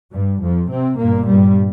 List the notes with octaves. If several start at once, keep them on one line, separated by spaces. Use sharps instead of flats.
G2 G3
F2 F3
C3 C4
G1 G2 A#2 A#3
G2 G3